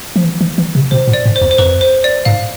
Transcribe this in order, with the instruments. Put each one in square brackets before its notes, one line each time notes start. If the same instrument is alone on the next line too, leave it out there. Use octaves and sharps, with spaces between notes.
[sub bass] F3
E3
E3
E3
C3
[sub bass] B2 [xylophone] C5
[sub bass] A2
[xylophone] D5
[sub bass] G#2
[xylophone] C5
[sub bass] E2
[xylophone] C5
[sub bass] F2 [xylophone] B4
[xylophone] C5
D5
[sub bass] G#2 [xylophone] F5